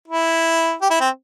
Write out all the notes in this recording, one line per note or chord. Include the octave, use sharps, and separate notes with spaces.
E4
G4
E4
C4